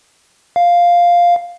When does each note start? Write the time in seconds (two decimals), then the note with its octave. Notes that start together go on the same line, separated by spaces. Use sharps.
0.56 F5